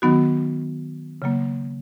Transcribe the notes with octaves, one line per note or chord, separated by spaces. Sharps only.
D#3 F#3 B3 D#4 F#4
C#3 F#3 A#3